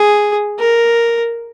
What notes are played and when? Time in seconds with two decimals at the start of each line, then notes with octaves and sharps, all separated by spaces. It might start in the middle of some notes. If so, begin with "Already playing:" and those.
Already playing: G#4
0.59 A#4